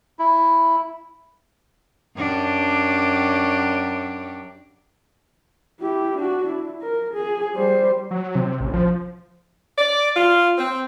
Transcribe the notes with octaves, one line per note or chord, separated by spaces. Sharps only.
E4
F#2 D4 G4
E4 G4
D4 F#4
E4
A#4
G#4
G3 C5
F#3
C3
A1
F3
D5
F4
C4